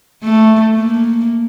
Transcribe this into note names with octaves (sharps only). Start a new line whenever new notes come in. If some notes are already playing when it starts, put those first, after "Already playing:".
A3
A#3